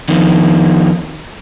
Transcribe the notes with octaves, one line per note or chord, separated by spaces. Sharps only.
F2 D#3